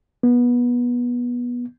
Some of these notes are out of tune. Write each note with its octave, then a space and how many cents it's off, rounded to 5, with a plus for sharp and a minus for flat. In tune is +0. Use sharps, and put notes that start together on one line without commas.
B3 -20